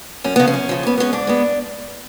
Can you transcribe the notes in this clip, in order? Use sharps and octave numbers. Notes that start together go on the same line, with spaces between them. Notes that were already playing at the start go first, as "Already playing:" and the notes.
F#2 C#4
C#3 F3 B3
C#4
F#2
C#3 F3
G#2 B3
G#3 B3 C#4
G#2 D4
G#3 B3